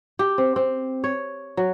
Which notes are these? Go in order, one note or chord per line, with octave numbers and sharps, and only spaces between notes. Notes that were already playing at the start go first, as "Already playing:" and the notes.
G4
C4
C4
C#5
F#3